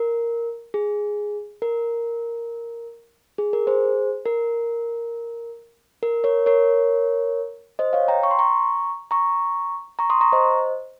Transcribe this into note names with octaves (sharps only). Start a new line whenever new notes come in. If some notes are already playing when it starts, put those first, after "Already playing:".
Already playing: A#4
G#4
A#4
G#4
A#4
G#4 C5
A#4
A#4
A#4 C#5
A#4 C#5
C5 D#5
C#5 F5
G5 A#5
C#6
C6
A#5 C#6
A#5 C#6
A#5 C#6
C6 D#6
A#5 C#6
C5 D#5